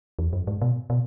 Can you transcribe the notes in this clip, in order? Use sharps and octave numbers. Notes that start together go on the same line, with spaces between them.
E2
F#2
G#2
B2
B2